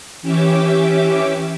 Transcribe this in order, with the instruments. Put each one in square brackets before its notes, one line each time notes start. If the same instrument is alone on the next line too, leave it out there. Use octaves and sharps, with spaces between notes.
[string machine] E3 C#4 G4 E5 D6